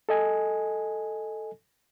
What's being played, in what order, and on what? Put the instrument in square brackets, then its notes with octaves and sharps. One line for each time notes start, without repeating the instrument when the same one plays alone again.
[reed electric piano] A4 D#5 G#5